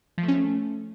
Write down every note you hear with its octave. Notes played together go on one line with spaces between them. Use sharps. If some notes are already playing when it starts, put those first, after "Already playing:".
F3
A3
C#4
A3